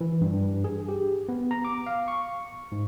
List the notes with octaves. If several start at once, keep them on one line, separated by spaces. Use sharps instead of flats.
E3
G2
G#4
G4
B3
A#5
D6
F5
C#6
G#2